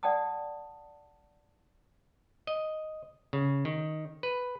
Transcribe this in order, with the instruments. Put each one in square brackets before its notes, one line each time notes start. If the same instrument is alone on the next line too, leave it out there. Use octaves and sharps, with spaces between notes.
[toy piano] D5 F#5 G5 A5 D#6
[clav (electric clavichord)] D#5
C#3
D#3
B4